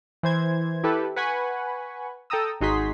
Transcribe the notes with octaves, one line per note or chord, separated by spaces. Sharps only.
E3 C5 G#6
E4 G4 A4 B4
B4 F#5 G#5 B5 C#6
A4 G5 A5 A#5 D#6 E6
G#1 D#4 F#4 G#4 C6 B6